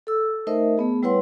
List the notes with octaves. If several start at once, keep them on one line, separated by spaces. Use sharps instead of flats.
A4 E6
A3 D#4 A#4 C5 D#5 E5
A3 B3 G#4
G3 E4 B4 C#5 F#5 C6